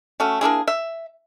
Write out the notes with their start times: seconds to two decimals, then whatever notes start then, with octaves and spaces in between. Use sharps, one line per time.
0.20 A3 C#4 F#4
0.41 A#3 D4 E4 G#4
0.68 E5